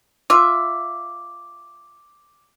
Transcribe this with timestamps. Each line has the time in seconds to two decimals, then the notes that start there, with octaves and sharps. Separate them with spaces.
0.30 F4 E5 D6